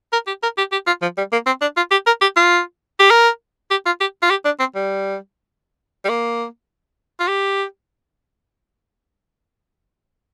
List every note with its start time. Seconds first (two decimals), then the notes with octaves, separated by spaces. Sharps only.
0.13 A#4
0.27 G4
0.43 A#4
0.58 G4
0.72 G4
0.87 F4
1.02 F3
1.18 G3
1.32 A#3
1.46 C4
1.61 D4
1.77 F4
1.91 G4
2.07 A#4
2.21 G4
2.37 F4
2.99 G4
3.11 A#4
3.71 G4
3.86 F4
4.01 G4
4.22 F4
4.30 G4
4.45 D4
4.59 C4
4.75 G3
6.05 G3
6.09 A#3
7.20 F4
7.28 G4